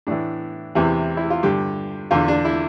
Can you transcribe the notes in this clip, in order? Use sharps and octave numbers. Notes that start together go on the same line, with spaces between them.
A2 E3 D4
E2 C3 E3
E4
F4
G2 D3 G4
E2 D3 F4
D4
E4